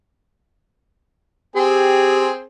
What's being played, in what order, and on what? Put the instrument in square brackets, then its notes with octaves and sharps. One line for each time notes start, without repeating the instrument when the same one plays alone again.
[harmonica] C4 G#4 [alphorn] G4